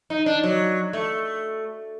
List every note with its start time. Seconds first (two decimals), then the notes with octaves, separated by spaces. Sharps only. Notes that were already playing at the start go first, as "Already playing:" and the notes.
0.10 D#4
0.26 D4
0.43 F#3
0.93 A3